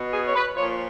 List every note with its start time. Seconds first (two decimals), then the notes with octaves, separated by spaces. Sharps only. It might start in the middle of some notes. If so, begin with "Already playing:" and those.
Already playing: B2
0.13 G#4
0.27 C#5
0.36 B4
0.57 A#2 F3 C#5